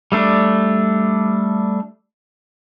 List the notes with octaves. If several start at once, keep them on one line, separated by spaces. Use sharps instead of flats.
G3 A3 D4